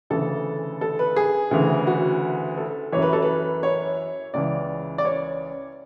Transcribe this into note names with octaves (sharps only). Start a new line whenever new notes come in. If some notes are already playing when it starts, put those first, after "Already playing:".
D2 C#3 E3 A4
A4
B4
G#4
D2 C#3 E3
F#4
A4
F#2 E3 C#5
B4
A4
B4
C#5
C#2 C#3 E3 D5
D5
C#5